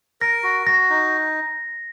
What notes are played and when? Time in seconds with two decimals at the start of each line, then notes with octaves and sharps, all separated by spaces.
0.21 A#4 A#6
0.43 F#4
0.66 F#4 A#6
0.90 D#4